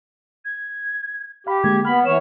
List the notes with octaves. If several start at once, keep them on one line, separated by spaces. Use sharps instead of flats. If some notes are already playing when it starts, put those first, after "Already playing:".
G#6
G4 F5 B5
D3 G#3 A#3 G#6
B3 B5 F6
E3 C#5 E7